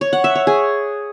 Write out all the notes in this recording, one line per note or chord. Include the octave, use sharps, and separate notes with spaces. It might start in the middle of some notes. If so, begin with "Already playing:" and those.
C#5
F#5
E5
C#5
G#4